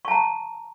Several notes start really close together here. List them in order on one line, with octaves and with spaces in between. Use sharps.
C#6 A5 A#5